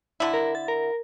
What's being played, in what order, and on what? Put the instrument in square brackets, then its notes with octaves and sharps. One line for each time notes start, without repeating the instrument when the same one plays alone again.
[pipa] D3 E4
[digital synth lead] A#4
A6
A#4